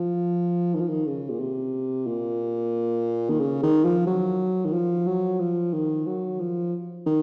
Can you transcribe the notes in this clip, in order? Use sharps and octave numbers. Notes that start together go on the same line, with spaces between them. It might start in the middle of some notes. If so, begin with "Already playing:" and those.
Already playing: F3
D#3
F3
D#3
C#3
A#2
C3
A#2
D#3
C#3
D#3
F3
F#3
D#3
F3
F#3
F3
D#3
F#3
F3
D#3